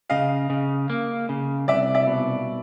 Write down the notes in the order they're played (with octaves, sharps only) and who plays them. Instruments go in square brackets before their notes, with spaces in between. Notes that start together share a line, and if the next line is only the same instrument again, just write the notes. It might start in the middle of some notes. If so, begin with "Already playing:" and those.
[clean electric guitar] C#3 [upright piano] D#5 F5
[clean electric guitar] C#3
A#3
C#3
[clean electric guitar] C2 [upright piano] D5 E5
[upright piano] D5 E5
[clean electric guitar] B2